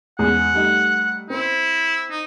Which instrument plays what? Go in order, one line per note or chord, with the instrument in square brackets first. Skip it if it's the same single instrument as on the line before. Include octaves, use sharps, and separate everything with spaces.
[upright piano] E2 G#2 G#4 [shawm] F#5
[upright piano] G3 A3 D#4
[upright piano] C4 C5 [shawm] E4
[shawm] D#4